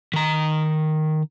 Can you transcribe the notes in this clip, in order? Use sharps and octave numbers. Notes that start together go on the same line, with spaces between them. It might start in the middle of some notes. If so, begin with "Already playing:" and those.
D#3 A#5